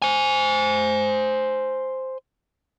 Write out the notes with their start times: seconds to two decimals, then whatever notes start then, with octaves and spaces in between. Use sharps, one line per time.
0.02 C5 G#5